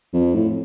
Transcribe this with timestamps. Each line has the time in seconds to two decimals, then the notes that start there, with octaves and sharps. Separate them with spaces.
0.13 F2
0.35 A2